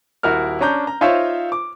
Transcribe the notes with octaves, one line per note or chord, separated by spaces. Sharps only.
D#1 E4 F#4 A#4 F6
C#4 D4 A#5 G6
A#5
D#4 F4 C5 C#5 E5 F5
D6